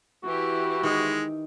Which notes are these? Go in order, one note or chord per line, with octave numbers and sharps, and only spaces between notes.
E3 E4 F#4 G4
D#3 G#3